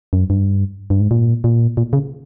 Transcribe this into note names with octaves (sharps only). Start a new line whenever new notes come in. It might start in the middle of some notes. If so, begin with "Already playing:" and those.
F#2
G2
G2
G#2
A#2
A#2
A#2
C#3